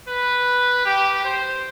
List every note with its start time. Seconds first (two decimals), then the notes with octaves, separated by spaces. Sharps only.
0.08 B4
0.86 G4
1.24 C5